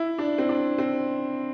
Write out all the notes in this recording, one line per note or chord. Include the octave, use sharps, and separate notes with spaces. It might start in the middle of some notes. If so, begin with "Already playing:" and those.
Already playing: E4
D4
C4
D4
C4